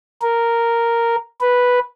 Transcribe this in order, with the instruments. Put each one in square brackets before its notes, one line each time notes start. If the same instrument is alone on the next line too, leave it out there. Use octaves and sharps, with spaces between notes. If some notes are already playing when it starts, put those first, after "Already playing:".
[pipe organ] A#4
B4